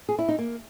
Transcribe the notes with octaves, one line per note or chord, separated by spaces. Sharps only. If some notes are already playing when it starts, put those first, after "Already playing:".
G#4
E4
D#4
A#3